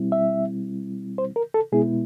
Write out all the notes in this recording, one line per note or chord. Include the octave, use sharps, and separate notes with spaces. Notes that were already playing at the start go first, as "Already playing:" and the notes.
Already playing: B2 G3 C4 E4
E5
C5
A#4
A4
B2 G#3 B3 E4 G#4